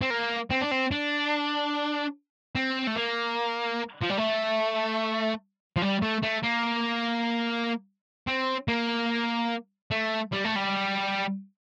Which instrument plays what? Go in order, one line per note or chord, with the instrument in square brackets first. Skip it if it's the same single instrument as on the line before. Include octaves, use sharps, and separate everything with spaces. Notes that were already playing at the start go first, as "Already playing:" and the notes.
[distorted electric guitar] C4
A#3
C4
D4
C4
D4
C4
A3
A#3
F3
G3
A3
F3
G3
A3
A3
A#3
C4
A#3
A3
G3
A3
G3